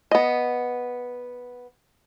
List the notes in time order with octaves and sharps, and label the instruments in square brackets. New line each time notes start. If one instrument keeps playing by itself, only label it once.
[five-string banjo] B3 D#5